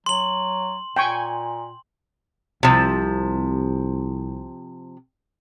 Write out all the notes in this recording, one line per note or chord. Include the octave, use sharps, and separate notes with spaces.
F#3 C6 F#7
A#2 G5 G#5 C#6
C2 C3 F3